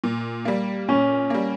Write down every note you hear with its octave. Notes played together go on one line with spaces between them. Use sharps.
A#2
G3 A#3
A#2 C#4
G3 A#3